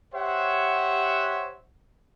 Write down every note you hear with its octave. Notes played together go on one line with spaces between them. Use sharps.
G4 C5 C#5 E5 F#5